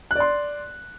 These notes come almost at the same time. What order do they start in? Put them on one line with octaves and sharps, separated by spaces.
F#6 D5 C6